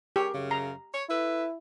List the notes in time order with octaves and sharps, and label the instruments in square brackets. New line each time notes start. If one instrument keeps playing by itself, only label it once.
[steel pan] G4 [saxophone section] G#4 A#4 C#5
[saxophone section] F#2 C#3
[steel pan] A#5
[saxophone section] C#5
[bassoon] E4 [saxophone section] A4 B4 E5